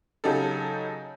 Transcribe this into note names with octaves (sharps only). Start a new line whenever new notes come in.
C#3 F#3 D#4 G4 A4